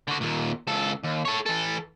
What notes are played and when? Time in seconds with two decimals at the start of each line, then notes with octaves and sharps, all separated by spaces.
0.08 D3 F#4
0.21 D#2 A#2
0.67 C#2 A4
1.03 D#2
1.25 A4 C#5
1.46 E3 A4